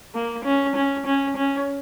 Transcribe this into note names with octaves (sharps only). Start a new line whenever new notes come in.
A#3
C#4
C#4
C#4
C#4